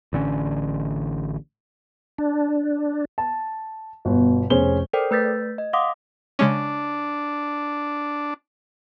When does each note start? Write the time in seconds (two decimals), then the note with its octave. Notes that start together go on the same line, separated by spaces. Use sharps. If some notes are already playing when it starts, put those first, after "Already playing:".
0.13 A1 D3 C4 C#4
2.18 D4
3.18 A5
4.05 G1 B2
4.50 F1 C#4 G#4 C5 G7
4.93 A4 A#4 C5 D5 G5
5.11 A3 B4 G6 A6 B6
5.58 D#5
5.73 F5 F#5 C6 D6 D#6
6.39 C#3 G#3 C#4 D4